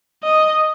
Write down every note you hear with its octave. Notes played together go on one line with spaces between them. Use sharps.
D#5